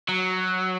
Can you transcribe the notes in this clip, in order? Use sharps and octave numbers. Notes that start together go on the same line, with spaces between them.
F#3